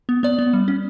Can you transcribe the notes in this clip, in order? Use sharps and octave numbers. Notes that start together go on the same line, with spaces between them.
B3
B3 D5
B3
G3
C#4